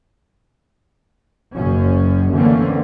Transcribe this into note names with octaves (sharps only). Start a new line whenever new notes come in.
F#1 F#2 C#4
D3 E3 A3 A#3 C4 C#4